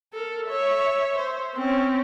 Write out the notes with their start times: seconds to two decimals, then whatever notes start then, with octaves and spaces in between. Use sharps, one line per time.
0.14 A4 A#4
0.47 C#5 E5
1.19 C5
1.55 C4 C#4